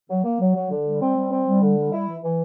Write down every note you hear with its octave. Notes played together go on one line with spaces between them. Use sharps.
F#3
A#3
F#3
F#3
D3
G3
C4
G3
C4
G3
D3
G3
E4
E3
E3